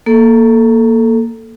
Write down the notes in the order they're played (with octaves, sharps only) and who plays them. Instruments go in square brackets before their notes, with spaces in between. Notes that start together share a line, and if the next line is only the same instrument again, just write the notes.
[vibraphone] A#3 A4